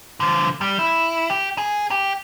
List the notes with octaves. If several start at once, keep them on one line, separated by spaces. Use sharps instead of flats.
D3 F3
G3
E4
G4
G#4
G4